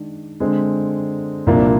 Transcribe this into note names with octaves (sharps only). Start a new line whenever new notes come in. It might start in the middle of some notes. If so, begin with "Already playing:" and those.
Already playing: D#3 G#3 D4
D3 G#3 C4
C2 A#2 F3 A#3 D4